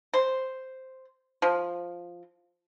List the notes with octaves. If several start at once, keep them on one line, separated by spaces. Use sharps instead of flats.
C5
F3